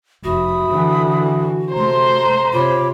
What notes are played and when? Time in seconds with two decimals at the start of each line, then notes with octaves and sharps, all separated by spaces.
0.24 F1 F#4 E5 B5 D#6
0.70 D3 E3
1.73 C3 A3 C5 A#5 C6
2.53 C3 F4 C#5 B5 D6